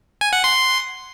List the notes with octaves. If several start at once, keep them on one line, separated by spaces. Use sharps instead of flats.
G#5
F#5
C6